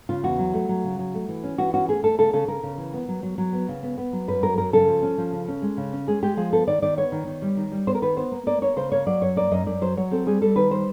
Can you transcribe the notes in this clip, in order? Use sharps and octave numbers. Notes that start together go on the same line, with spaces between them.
C#3 F4
E2 F#4
F#3
A3
F#3
C#3
F#3
A3
E3
C#4
E3 F#4
C#4 F#4
A3 G#4
A3 A4
C#3 A4
C#3 A4
C#3 A#4
C#3
E3
B3
F#3
F#3
F#3
B3
C#3
B3
B3
F#3
F#2 B4
F#3 A#4
F#2 A#4
C#3 A4
F3
C#4
F3
C#3
C#4
G#3
C#3
C#4
G#3 G#4
G#3 G4
F3 G#4
B3 A4
D#3 D5
D#3 D5
B3 C#5
D#3
D#3
G3
D#3
G3
B3 C5
A#4
D#3 B4
B3 C5
A#3
A#3 D5
A#3 C#5
C#3 C5
A#3 C#5
F#3 D5
F#2 C#5
A#3 D5
F#2 D#5
F#2 D5
F#3 C5
F#3 C#5
C4 A4
G3 G#4
G3 A4
D#3 B4
G3 C5